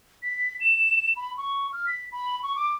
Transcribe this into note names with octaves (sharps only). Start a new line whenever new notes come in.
B6
E7
B5
C#6
F6
B6
B5
C#6
D6